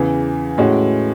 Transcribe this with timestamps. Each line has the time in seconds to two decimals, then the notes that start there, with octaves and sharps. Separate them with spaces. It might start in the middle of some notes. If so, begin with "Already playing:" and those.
Already playing: E2 C#3 E3
0.58 A2 G#3 C#4 F#4